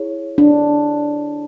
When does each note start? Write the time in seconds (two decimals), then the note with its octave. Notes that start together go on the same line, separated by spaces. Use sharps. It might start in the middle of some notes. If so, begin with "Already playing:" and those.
Already playing: E4 G#4 C#5
0.38 D4